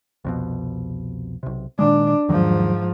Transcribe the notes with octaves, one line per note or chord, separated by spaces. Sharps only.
C2 F2 B2
B1 C3
A#2 D#3 G#3 D4
E2 G#2 D#3 F3 F#3